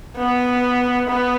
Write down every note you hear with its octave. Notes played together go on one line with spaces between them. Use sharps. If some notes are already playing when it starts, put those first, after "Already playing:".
B3
B3